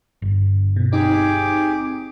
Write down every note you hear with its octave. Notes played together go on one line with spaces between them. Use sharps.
G1
B2
C4 D#4 G4 G#4 D6